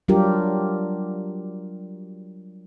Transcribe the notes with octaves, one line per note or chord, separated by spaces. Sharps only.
F#3 G3 D4 F4 G4 A#4